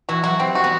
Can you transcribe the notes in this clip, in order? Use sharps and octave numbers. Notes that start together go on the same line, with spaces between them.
E3 F#4
F#3 F#4
G3 C4
F#4
B3